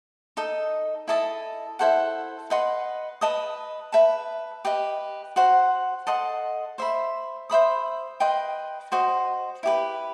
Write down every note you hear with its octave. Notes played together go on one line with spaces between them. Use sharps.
D#4 A4 D#5
E4 A4 D#5 A5
E4 A4 C5 F#5
B4 D#5 F#5 C6
B4 D#5 A5 D#6
B4 E5 A5
G4 B4 D#5
F#4 C5 F#5
A4 D#5 F#5 C6
C5 E5 B5
C5 E5 B5 D#6
B4 D#5 G5 C6
F#4 C5 D#5
E4 G4 B4